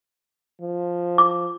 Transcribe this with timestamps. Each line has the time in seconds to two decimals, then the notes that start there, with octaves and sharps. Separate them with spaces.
0.62 F3
1.18 D6